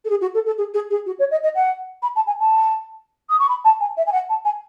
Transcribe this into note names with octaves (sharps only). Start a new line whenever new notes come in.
A4
G#4
F#4
A4
A4
G#4
G#4
G#4
F#4
C#5
D#5
D#5
F#5
B5
A5
G#5
A5
D#6
C#6
B5
A5
G#5
E5
G#5
F#5
A5
G#5